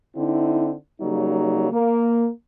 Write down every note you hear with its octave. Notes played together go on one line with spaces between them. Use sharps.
D3 C4 D#4 E4
C#3 F#3 G3 A#3 D#4
A#3